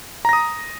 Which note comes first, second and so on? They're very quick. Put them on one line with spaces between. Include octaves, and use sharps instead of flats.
A#5 A#6 D#6